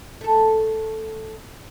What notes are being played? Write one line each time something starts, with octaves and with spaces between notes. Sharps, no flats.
A3 A4